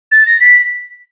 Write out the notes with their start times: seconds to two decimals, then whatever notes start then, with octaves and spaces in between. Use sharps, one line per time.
0.12 A6
0.26 A#6
0.40 B6